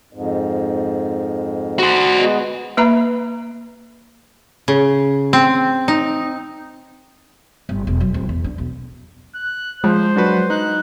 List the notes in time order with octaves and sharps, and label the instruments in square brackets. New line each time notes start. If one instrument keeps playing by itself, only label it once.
[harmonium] F2 G#2
[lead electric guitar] F#4 C5
[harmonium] G#3 B3
[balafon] A#3 B4 E5 A#5 B5
[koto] C#3
C4
D#4
[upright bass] G1
E1
F#3
D1
E2
D4
B1
[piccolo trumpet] F#6
[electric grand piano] F3 [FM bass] G#3 [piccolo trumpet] C5
[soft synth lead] F#3 [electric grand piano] D4 F#4 B4
[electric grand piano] D#4 [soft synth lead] F#6